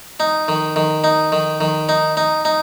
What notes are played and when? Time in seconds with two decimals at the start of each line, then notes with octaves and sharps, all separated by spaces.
0.20 D#4
0.48 D#3
0.76 D#3
1.04 D#4
1.32 D#3
1.61 D#3
1.89 D#4
2.17 D#4
2.45 D#4